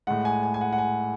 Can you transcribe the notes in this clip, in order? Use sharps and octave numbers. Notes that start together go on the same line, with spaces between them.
A2 G#3 F#5
G#5
G#5
G#5
F#5
F#5
G#5